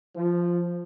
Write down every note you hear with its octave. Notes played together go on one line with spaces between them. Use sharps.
F3